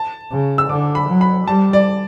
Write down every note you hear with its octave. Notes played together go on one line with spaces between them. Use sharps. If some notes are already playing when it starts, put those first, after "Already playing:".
Already playing: A5
C#3
E6
D3 D6
B5
F#3
B5
G3 A5
D5